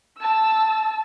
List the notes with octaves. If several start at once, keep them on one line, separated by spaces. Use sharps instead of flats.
A5 E6